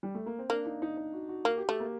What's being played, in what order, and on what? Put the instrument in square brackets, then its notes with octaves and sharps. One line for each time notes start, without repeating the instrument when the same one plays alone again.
[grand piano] G3
A3
A#3
C4
[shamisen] A#3 [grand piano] D4
[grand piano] D#4
D#4
D#4
F#4
F#4
[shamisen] A#3 [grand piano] F#4
[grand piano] G4
[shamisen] A3 [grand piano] G4
[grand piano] A#3